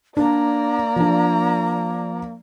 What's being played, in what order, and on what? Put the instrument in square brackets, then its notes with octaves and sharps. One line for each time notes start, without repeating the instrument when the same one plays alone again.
[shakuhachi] A#3 [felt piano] D4 [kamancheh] D5 A#5
[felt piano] F3 D4